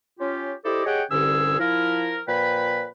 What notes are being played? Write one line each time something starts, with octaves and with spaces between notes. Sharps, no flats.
C#4 F4 G4
E4 G4 A4 C5 D5 D#5
G4 G#4 C#5 D#5 F#5 G5
C2 G2 D3 C#4 G#4 E6
F3 E4 A#4
A#2 F3 B4 G5 B5